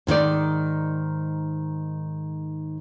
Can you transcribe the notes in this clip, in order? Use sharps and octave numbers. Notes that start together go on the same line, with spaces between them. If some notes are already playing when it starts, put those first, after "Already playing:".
G#2 D#3 D#4 D5